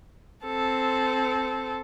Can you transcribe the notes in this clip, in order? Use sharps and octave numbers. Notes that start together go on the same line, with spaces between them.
C4 A4